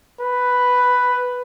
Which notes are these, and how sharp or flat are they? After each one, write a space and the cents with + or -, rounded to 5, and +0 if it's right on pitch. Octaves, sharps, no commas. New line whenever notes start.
B4 +5